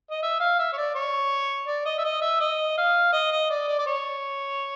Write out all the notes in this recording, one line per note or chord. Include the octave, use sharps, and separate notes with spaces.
D#5
E5
F5
E5
C#5
D5
C#5
D5
D#5
E5
D#5
E5
D#5
F5
D#5
D#5
D5
D5
D5
C#5